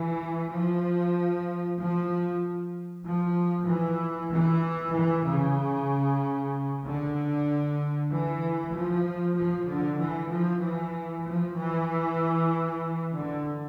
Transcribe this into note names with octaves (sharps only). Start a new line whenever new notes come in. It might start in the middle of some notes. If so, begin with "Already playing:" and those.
Already playing: E3
F3
F3
F3
E3
E3
E3
C#3
D3
E3
F3
F3
D3
E3
F3
E3
F3
E3
D3